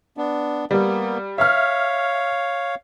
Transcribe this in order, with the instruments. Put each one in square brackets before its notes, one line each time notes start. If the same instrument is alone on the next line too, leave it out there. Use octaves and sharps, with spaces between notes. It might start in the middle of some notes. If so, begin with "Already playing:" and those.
[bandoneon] B3 D4
[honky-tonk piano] G3 [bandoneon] A#3 B3
[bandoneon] C#5 F5 [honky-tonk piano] E5 F6